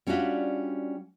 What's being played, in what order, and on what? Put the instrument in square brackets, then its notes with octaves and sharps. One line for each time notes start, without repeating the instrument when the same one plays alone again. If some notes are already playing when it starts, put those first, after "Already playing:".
[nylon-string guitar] G3 C#4 D4 F4 F#4 E5